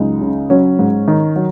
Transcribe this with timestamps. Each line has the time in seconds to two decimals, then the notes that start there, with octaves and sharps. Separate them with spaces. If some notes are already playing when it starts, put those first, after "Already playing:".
Already playing: C#2 F#3 D#4
0.21 C#3
0.50 F#3 C#4
0.79 G#2
1.08 D#3
1.36 F#3